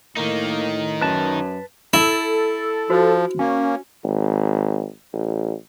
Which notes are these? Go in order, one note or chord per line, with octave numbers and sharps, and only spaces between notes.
A2 D#3 A#3 D#4
F#2 B4 A5
E4 A4
F3 F#4 C5
A#3 C#4
G#1
A1